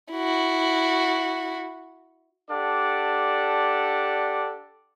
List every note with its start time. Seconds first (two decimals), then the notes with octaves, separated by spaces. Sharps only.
0.12 E4 F#4
2.50 D4 G4 A4 D5 F#5 A5